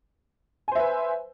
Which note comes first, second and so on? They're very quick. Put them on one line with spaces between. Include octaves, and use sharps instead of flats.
G#5 C5 E5 B4